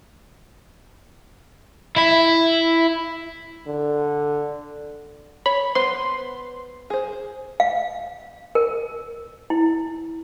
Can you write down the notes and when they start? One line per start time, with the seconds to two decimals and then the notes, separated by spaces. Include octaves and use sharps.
1.97 E4 E5
3.67 D3
5.46 C#5 B5
5.75 B3 B4 C5 C6
6.90 G#4 C5
7.60 F5
8.55 A#4
9.50 E4